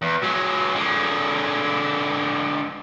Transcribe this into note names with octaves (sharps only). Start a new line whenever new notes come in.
E2
F#3 G#3
D3 G#3